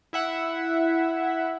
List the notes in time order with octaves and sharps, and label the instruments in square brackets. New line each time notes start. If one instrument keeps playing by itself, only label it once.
[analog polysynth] E4 E5 F#5